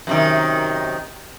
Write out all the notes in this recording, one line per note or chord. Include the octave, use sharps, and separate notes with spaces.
F#2 C3 D#3